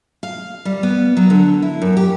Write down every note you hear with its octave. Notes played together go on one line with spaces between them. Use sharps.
F5
G3
B3
F#3
D3
E4
F#2
G4